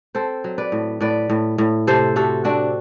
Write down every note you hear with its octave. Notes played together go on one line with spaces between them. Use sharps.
C4 A4 C5
F#3
B4 D5
A2
A2 B4 D5
A2
A2
C3 A4 C5
C3 F#4 A4
C4 D4 F#4